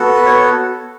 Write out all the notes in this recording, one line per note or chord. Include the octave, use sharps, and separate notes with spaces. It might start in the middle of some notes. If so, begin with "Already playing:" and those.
Already playing: B3 F#4 A4
B4
C#5